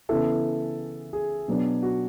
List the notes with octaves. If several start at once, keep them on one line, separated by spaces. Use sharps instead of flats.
C#3 E3 B3 E4 A4
G#4
B2 F#3 B3 D4
F#4